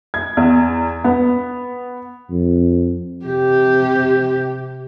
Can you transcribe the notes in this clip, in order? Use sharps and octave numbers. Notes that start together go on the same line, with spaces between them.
G#6
E2
B3
F2
C3 G4